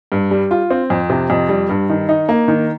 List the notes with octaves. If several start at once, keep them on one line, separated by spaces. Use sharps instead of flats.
G2
G3
F4
C4
F2
C3
F2
G3
G2
D#3
D#4
A#3
D#3